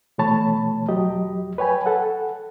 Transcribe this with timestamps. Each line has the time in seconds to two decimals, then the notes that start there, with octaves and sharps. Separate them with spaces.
0.18 B2 E3 A3 C#5 A5 B5
0.88 E2 F#3 G4 D#5
1.58 B4 C#5 G5 G#5 B5
1.86 A4 F#5